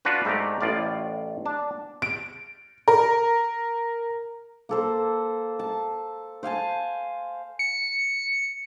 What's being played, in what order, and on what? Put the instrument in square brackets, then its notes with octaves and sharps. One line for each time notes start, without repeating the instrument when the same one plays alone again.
[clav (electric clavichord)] D4 F4 F#4 B4
G#2 A3 G4 D5 A#5
A1 A2 F4 D5
D4 A5
[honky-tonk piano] D7
A#4
[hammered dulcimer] A#3 A4 C5
A5
C5 F5 G#5 A5
[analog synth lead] C#7